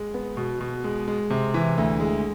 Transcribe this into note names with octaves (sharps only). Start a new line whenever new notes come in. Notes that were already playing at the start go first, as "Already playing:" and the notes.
Already playing: G#3
B3
B2
B2
G#3
G#3
C3
E3
D2
G#3